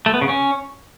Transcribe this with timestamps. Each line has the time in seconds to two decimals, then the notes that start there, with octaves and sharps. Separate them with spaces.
0.06 A3
0.14 B3
0.21 C#3
0.29 C#4